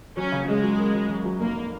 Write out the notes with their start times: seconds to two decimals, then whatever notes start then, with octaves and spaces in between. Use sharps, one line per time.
0.17 F#3 C#4
0.32 C#3
0.47 C#3 G#3
0.63 F#3
0.78 A#3
0.95 F#3
1.09 F#2
1.25 F#3
1.40 F1 A#3